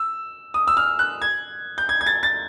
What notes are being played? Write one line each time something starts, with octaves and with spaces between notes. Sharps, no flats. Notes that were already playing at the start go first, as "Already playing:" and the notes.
Already playing: E6
D#6
E6
F6
F#6
G#6
G6
G#6
G#6
A6
A6